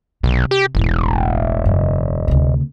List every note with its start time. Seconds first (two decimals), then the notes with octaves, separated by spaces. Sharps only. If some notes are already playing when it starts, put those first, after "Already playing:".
0.23 B1 C3
0.51 G4
0.75 E1 A1 A2
1.65 F#2 C#3
2.28 D2 C3